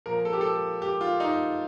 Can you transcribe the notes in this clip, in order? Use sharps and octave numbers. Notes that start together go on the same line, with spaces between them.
A#2 F3 A#4
A4
G4
A4
G4
F4
D#4